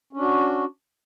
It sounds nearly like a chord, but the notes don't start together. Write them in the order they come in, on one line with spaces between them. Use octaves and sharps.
C#4 D4 F#4